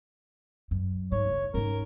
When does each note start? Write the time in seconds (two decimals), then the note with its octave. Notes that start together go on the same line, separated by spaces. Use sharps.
0.71 F#2
1.12 G#2 C#5
1.25 F#1
1.54 G#2 C#4 A#4